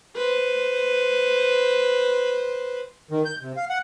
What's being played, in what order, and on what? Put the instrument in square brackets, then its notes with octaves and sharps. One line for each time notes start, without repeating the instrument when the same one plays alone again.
[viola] B4 C5
[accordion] D#3
G6
C3
F5
F#5